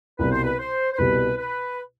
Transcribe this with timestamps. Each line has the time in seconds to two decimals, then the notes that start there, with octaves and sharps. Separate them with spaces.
0.19 C2 B2 G3 B4
0.31 C5
0.44 B4
0.59 C5
0.93 C5
0.98 C2 B2 G3 B4
1.38 B4